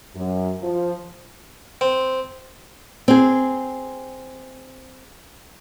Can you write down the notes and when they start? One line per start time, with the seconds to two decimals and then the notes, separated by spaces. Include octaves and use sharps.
0.15 F#2
0.62 F3
1.81 C4
3.08 C4 G#4